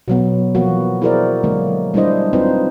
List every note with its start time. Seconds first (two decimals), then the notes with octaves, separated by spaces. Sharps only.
0.08 B2 F#3 B3
0.55 E3 F3 A#3 B3 F#4
1.02 E4 F#4 G#4 A#4 C5 D5
1.43 D3 F#3 G#3 A#3
1.94 G3 G#3 D4 E4 C5 D#5
2.33 C4 D#4 F4 B4 C5